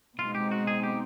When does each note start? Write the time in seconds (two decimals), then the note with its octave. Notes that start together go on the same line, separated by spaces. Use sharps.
0.19 B2 G#3 C4 D#4 F4
0.35 G4
0.51 F#4
0.67 G#4
0.83 G4